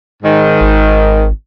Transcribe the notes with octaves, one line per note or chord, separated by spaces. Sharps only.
G#2 D#3
G#1